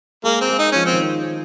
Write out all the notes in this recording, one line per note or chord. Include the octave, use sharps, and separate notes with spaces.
G#3 A#3
C4
G#3
D#4
F3 C#4
C4
D#3